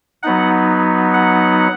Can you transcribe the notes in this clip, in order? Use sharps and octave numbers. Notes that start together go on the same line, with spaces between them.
F#3 B3 D#4 F#5
F#5